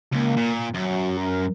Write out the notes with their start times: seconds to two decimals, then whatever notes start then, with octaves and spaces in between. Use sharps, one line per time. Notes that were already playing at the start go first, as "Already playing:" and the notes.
0.13 C#2 A#3
0.37 A#2
0.74 F#2 F#3
1.17 A#4